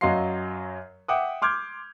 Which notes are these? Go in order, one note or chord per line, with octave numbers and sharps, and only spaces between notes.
F#2 F#3 D#5 F5 C6 C7
E5 F#5 G5 D6 D#6
C6 D6 F6 G6 G#6